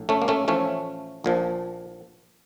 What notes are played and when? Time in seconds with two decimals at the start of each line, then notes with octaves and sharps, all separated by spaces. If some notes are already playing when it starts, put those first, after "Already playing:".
Already playing: A#1 A2
0.09 A3 C#4
0.22 A#3
0.28 A3 C#4
0.48 A1 A2 F3 A3 C#4
1.24 A#1 A#2 F3